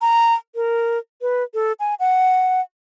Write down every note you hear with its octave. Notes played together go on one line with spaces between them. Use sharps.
A#5
A#4
B4
A4
G#5
F#5